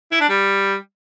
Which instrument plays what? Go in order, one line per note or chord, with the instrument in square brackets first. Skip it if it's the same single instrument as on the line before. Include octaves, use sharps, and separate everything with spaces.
[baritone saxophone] E4
D4
G3